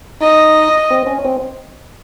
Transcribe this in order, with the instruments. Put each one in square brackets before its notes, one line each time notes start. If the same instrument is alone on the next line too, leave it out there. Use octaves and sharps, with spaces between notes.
[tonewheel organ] D#4 [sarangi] D#5
[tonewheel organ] C4
C#4
C4